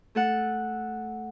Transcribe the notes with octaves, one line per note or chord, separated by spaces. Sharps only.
A3 A4 F#5